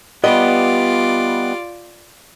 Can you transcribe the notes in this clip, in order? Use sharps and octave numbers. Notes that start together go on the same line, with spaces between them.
G3 B3 F4 D5 D#5